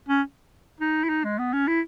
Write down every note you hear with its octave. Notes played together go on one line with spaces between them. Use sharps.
C#4
D#4
E4
D#4
G#3
B3
C#4
E4